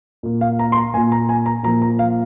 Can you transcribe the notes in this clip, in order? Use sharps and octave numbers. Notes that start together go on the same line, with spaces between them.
A#2 A#3
F5
A#5
C6
A#5
A#2 A#3 G#5
A#5
G#5
A#5
A#2 F3 A#3 A#5
A#5
F5